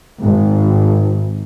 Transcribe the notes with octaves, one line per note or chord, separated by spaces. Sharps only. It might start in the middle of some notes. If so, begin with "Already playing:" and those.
G#1